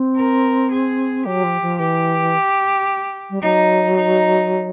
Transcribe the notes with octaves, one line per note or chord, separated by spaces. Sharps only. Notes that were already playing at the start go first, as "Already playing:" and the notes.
Already playing: C4
A#4
G#4
F#3 G4
F3
F3
E3 G4
G3
F#3 D#4
D#4